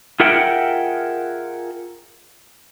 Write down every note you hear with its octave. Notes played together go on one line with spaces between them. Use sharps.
F4 G#4 A#4 E5 F#5 G5